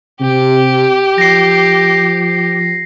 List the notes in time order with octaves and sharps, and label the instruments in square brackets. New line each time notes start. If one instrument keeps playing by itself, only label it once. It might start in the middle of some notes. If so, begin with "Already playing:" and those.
[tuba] C3 [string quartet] G4
[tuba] F3 [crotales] A#6 C7